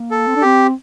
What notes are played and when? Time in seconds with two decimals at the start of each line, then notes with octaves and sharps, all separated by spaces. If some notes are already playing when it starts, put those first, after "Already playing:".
Already playing: A#3
0.11 A4
0.27 C4
0.36 D4
0.42 C4 G4